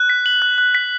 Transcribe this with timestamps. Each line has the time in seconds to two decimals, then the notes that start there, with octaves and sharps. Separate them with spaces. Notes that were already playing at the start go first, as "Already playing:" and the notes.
Already playing: F#6
0.09 B6
0.26 F#7
0.42 F#6
0.58 F#6
0.75 B6